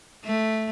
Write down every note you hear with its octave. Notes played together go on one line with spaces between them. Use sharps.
A3